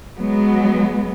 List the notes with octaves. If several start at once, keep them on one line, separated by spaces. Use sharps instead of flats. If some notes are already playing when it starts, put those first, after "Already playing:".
F#3 G#3 B3